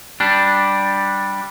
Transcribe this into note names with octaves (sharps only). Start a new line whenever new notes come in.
G3 D4